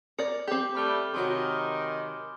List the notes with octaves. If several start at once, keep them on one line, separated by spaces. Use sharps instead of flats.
A#4 D5 C#7
C4 G4 D6 G6
G3 A3 B5 F6 G7
C3 D#3 F#3 F#4 G#5 C6